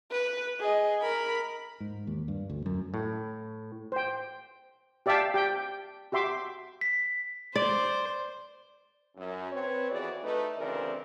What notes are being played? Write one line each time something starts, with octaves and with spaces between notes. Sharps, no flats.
B4
G#4 D#5
A#4 B5
G#2
D#2
G2
D2
F#2
A2
C5 G5
G4 D5 E5 F5 G5 A5
G4 G5
F#4 G4 E5 C6 D6
B6
C5 D5
F#2
C4 B4 C#5
F2 E3 B3 F#4 G#4 D5
A3 D#4 B4
D2 C#3 E3 C4 A#4 D5